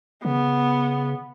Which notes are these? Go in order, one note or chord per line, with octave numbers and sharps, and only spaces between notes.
C#3 B3